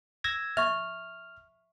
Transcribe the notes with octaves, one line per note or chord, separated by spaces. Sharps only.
E6 G#6 A#6
E5 C#6 F6